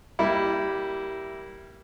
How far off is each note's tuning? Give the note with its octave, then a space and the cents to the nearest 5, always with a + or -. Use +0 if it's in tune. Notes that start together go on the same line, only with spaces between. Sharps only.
G3 -10 A#3 +0 E4 +0